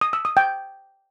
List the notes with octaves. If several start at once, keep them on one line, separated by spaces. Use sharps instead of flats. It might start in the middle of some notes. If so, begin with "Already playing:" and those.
D#6
E6
D#6
G5